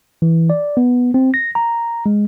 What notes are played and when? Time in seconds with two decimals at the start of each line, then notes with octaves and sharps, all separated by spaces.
0.22 E3
0.50 D5
0.77 B3
1.14 C4
1.34 A#6
1.55 A#5
2.06 G#3